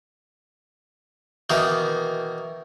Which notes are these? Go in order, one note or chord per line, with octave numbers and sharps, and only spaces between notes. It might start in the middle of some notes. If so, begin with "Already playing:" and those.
B2 D#3 E3 A#3